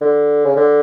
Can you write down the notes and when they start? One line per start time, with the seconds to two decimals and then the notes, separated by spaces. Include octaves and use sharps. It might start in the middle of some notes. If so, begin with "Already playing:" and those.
0.01 D3
0.45 C#3
0.56 D3